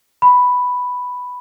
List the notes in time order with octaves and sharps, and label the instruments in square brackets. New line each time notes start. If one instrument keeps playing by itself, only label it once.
[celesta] B5